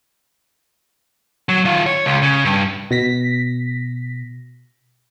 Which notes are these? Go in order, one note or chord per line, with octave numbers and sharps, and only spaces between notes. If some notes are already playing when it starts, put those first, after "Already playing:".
F#3
D#3 F4
C#5
C#2
C#3
G2
B2 A#6 B6